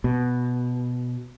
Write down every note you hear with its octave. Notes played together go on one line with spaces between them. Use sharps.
B2